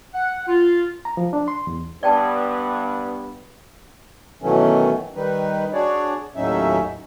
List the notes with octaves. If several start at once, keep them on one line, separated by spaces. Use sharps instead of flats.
F#5
F4
A#5
F3
D4
C6
E2
G2 B3 D5 G5 A5
B2 D#3 E3 F#3 A3 C#4
D#3 G3 D#4 B4
D4 F#4 G#4 C#5 D5
D#2 A2 F#3 C#4 D#4 E5